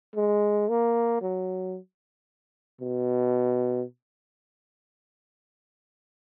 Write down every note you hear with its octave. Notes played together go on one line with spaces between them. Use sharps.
G#3
A#3
F#3
B2